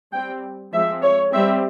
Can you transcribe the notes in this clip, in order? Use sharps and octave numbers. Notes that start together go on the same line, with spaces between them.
G3 C4 G5
F3 G#3 C4 E5
C#5
G3 C4 E5